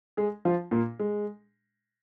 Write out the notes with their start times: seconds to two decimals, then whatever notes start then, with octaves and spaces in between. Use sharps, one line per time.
0.17 G#3 G#4
0.45 F3 F4
0.71 A#2 A#3
1.00 G#3